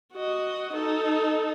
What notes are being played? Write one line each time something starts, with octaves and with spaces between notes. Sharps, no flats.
F#4 D#5
D#4 A4